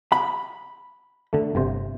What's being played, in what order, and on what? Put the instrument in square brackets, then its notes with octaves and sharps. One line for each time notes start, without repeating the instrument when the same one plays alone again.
[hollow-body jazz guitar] B5
[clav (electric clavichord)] D3 A3
G1 C3 C5